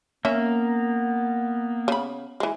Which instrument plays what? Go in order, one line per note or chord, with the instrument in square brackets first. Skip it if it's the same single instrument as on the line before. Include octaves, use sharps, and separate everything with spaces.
[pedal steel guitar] A#3 [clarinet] B3 [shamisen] C#4 E5
[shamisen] C#3 B5
E3 G#3